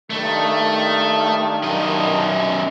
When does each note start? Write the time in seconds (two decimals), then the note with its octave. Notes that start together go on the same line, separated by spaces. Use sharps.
0.10 G2 D#3 A3
1.63 F#2 D#5